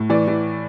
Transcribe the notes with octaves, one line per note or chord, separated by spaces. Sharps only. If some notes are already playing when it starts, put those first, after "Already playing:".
Already playing: A2
E3 D5
E3